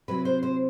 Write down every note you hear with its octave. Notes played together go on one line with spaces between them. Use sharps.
C3 F#3 C4 E4 B4
C5
C5